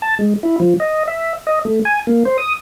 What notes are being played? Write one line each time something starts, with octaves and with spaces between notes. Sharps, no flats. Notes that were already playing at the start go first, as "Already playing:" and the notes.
A5
G#3
E4
F3
D#5
E5
D#5
A3
G#5
A#3
C5
D#6